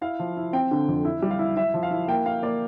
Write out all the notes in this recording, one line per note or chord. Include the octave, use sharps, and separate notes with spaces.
E4 F5
F3
E4
C4 G5
D3
F2
E4
G3
F5
E4
E4 E5
F3
F5
E4
A#3 G5
A#3 F5
A#3 D5